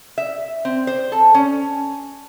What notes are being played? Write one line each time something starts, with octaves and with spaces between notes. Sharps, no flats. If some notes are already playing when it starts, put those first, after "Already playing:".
E5
C4
C5
A4
C#4